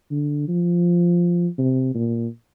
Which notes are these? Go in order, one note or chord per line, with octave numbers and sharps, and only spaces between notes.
D3
F3
C3
A#2